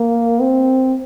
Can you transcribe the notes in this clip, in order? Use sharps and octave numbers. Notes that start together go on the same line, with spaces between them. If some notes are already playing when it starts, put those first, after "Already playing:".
Already playing: A#3
C4